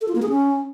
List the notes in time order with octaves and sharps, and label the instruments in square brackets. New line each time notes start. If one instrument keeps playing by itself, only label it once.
[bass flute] A4
F4
A#3
G#4
C#4